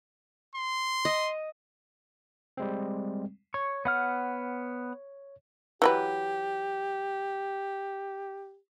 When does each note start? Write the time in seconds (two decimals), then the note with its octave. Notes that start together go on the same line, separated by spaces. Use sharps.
0.55 C6
1.05 D#5
2.57 G3 G#3 C4
3.54 C#5 C#6
3.85 B3 F#5 F6
5.82 E3 F#3 G4 B4